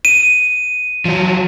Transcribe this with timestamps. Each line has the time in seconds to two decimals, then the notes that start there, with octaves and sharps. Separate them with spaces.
0.05 D#7
1.05 F3 F#3